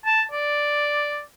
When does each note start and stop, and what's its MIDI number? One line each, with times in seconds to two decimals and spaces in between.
0.06 0.22 81
0.31 1.19 74